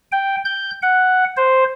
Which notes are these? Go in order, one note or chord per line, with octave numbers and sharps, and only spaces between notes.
G5
G6
F#5
C5